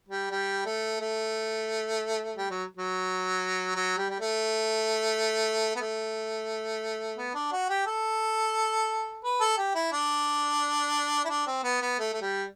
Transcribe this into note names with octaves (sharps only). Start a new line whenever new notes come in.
G3
G3
A3
A3
G3
F#3
F#3
F#3
G3
G3
A3
B3
A3
B3
D4
F#4
G4
A4
B4
A4
G4
E4
D4
E4
D4
C4
B3
B3
A3
A3
G3